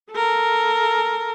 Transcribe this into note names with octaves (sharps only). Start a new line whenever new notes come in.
A4 A#4